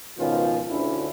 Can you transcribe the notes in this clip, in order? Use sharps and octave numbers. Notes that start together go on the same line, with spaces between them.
C#2 B2 D#3 F3 C#4 F4
D2 D3 C#4 E4